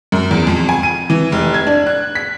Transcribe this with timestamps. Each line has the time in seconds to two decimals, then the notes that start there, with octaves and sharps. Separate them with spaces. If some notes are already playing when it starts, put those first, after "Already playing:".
0.12 F#2
0.31 E2
0.47 F2
0.69 G#5
0.83 D#7
1.10 E3
1.32 F1
1.54 G#6
1.67 D4
1.87 F#6
2.15 B6